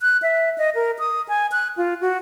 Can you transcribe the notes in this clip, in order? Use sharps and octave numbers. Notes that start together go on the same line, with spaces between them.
F#6
E5
D#5
A#4
D#6
G#5
F#6
F4
F#4